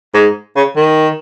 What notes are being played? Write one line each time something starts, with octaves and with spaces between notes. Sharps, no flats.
G#2
C#3
D#3